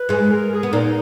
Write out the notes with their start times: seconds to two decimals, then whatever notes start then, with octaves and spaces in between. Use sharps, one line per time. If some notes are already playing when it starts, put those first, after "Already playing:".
Already playing: B4
0.09 G#2 G#3
0.30 A#4
0.52 G#4
0.63 B3
0.72 A#2 A#3 D#4